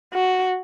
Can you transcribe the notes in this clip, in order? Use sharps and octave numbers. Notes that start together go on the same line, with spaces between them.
F#4